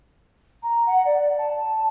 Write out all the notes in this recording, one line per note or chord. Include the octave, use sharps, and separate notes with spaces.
A#5
F#5
D5
A5